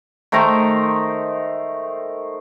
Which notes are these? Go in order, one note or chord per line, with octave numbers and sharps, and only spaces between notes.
D#3 A3 C5 A#5